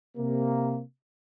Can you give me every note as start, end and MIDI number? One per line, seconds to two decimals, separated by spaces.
0.16 0.80 48
0.16 0.80 58